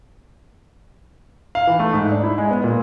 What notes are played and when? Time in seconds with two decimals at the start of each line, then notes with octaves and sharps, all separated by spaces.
1.55 F5
1.67 E3
1.79 A3
1.93 G#2
2.12 D4
2.23 E4
2.38 G#3
2.51 B3
2.64 A#2